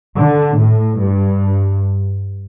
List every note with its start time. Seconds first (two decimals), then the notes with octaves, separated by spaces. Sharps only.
0.17 D3
0.58 A2
1.00 G2